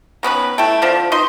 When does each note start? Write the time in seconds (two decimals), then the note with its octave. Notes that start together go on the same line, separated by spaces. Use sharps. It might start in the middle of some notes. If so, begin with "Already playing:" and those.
0.23 D#3 B3 C#4 B4
0.58 A3 E4 A4 G5
0.82 D3 F3 C4
1.12 D#4 B4 D#5 C6